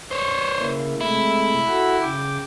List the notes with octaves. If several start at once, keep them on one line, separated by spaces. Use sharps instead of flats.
C5 C#5
C#3 A#3 E4
C3 G#3 A3 E4
F#4 A4 F#5
C#3 G5 D6